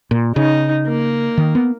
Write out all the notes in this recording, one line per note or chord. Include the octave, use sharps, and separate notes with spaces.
A#2
C#3 D#4
A#3
D#3
B3